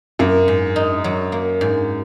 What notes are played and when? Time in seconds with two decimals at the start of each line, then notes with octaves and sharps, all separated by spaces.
0.19 F#2 A#3
0.48 G#2
0.76 D#4
1.04 F#3
1.32 A#3
1.61 G#2